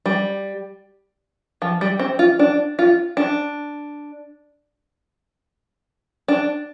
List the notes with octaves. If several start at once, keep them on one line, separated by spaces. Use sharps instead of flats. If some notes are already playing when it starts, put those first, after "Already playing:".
G3
F3
G3
C4
F4
D4
F4
D4
D4